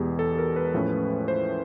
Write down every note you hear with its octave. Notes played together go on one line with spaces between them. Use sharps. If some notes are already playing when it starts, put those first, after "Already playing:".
Already playing: E2 B2 G#3 B3 G4 G#4
A4
A#4
B4
A2 F3 A3 C#4
C5